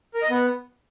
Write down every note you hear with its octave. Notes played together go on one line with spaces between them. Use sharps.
A#4
D#5
B3